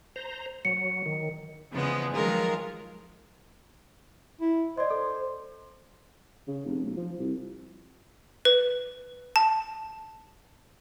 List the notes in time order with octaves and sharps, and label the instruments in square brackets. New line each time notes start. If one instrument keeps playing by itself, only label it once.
[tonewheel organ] C5 A#5
[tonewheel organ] F#3 [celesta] C#7
[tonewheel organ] D#3
[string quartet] E2 C#3 F3 G#3 B3
D#3 F3 F#3 G#3 F4 A#4
[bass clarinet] E4
[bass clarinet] C5 [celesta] D5 D#5
[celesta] A4
[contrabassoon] C#3
F1
B1
F3
C2
[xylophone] B4
A5